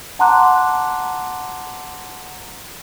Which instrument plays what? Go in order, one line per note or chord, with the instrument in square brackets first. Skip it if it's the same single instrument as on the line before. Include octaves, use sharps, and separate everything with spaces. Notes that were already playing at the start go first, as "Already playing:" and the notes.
[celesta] F#5 A5 A#5 C6 D6 F#6